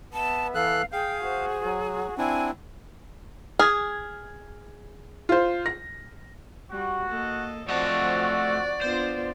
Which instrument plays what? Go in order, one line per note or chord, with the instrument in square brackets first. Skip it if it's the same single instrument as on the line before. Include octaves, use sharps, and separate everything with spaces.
[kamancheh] B3 E5 [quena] A5
[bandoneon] E3 A4 F#6 [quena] F5
[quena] G#4 [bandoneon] F5 [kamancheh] G5
[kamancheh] F#4 C5
[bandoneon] F#3 [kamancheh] F#4
[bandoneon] C4 D4 E4 [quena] G#5
[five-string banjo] G#4 [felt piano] F6 G#6
[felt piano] F4 C5
A#6
[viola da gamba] G3 [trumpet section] F#4
[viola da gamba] A#3 A4 D#5
[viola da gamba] F3 C4 [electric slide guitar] A3 D#5 A5 [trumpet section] F#4 [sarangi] D5
[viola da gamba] B3 D4 F4 [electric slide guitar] C5